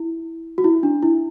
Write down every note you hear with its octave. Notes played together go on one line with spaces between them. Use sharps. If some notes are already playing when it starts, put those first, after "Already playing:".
Already playing: E4
F#4
E4
D4
E4